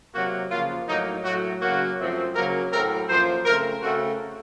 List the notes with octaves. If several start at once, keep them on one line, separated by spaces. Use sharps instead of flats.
C3 F#3 A#3 F#4
C#3 F3 A#3 F4
A2 F#3 A#3 D#4
A2 F#3 A3 F#4
C#3 F#3 A#3 F#4
F#2 F3 A3 C4
C#3 F#3 A#3 A#4
A2 F#3 A3 C4 A#4
F#2 F3 A#3 C5
C#3 A3 C4 A#4
C#3 A3 C4 F#4